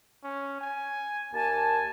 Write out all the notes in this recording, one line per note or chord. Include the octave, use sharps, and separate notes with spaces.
C#4
G#5
D#2 A#3 G#5 A5